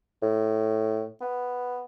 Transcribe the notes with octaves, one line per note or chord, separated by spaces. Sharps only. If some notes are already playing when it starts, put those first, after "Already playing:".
A2
B3